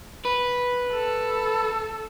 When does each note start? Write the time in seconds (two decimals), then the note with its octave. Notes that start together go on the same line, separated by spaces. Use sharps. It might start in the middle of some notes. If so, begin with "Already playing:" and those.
0.25 B4
0.94 A4